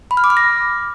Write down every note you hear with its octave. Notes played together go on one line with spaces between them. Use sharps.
B5
F6
D6
F6
A#6